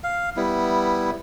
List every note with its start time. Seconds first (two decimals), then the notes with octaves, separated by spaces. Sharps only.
0.04 F5
0.37 G3 B3 E4